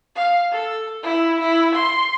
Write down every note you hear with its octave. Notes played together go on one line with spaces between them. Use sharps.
F5
A4
E4
E4
C6